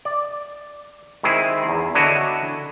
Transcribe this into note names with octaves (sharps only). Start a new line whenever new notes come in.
D5
D#3 G#3 C4 E4 G#4
E2
D3 D4 E4 F#4 C#5 D#5